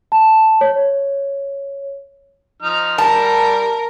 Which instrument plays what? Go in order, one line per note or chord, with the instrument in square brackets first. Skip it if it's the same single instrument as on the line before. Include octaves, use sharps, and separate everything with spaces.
[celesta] A5
C#5
[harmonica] F3 D#4 F6
[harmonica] G3 [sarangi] A#4 [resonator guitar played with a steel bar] A5